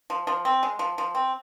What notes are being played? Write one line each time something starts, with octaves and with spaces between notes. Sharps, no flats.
F3
F3
C4
G#3
F3
F3
C4